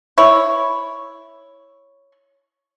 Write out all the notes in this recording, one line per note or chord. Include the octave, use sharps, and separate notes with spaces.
E4 C#5